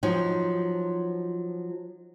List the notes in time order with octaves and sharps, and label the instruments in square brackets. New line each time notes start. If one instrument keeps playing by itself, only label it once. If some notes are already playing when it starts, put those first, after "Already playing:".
[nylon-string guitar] F3 F#3 D#4